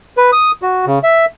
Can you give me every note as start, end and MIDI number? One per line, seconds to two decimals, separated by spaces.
0.17 0.31 71
0.32 0.51 87
0.62 0.85 66
0.87 0.99 49
1.03 1.25 76